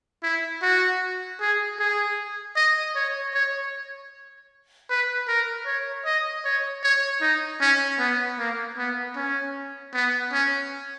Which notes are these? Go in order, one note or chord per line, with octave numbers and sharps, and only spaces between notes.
E4
F#4
G#4
G#4
D#5
C#5
C#5
B4
A#4
C#5
D#5
C#5
C#5
D#4
C#4
B3
A#3
B3
C#4
B3
C#4